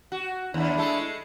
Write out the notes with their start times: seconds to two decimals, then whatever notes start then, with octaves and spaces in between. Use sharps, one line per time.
0.12 F#4
0.54 D#2 D4 E4
0.77 G#3 A3 A4